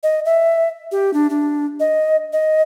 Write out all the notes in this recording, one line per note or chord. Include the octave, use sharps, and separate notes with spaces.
D#5
E5
G4
D4
D4
D#5
D#5